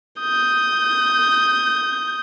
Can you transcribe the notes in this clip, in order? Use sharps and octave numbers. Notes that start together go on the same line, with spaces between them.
D#6 G6